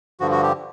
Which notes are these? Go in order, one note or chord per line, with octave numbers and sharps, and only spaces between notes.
G2 D3 F3 F#4
F#4
G4